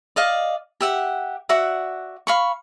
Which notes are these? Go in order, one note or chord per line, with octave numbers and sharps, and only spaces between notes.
D5 D#5 F5
G4 E5 F#5
F#4 D5 E5 F#5
F5 B5 C#6